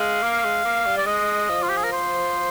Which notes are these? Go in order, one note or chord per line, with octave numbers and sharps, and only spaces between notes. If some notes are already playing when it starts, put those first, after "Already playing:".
Already playing: G#3 F5
A#3
G#3
A#3
G3
D5
G#3 D#5
F3
F4
G4
G#4
A#4
C5